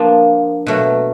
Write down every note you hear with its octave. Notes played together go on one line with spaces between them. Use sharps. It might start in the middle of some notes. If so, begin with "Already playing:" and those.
Already playing: F3 A#3 D4
B2 F#3 A3